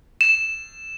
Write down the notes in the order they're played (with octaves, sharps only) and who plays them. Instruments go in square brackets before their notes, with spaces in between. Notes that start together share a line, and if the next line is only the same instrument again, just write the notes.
[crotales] E7